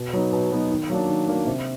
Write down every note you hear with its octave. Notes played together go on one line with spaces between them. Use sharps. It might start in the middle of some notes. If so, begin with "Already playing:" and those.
Already playing: B2
F#3 B3 D#4
B2
F#3 B3 D#4
D#3
F#3 A#3 D4
D#3
F#3 A#3 D4
C3